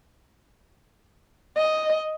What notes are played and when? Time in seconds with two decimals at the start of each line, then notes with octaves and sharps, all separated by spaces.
1.57 D#5